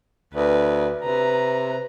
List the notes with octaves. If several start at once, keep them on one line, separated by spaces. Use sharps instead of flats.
D2 B4
C3 B4 A#5